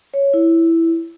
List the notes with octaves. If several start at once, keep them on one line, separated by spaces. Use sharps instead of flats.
C#5
E4